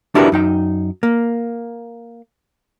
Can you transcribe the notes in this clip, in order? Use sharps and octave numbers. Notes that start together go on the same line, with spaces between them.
D4 E4 F#4 G4 A#4 B4
F#2 D#4 G5
A#3